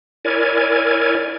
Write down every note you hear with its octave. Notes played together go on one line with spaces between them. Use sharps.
E4 A#4 C#5 D5 G#5